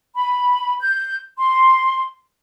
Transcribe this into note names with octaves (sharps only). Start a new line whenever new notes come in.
B5
G6
C6